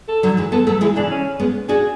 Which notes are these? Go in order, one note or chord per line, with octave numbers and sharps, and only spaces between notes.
A4
D3 F#3
E3 G#3
G#3 B3 A4
F#3 A3 A4
E3 G#3 E4
C#3 E3 D4
C#4
G#3 B3
D4 F#4 G#4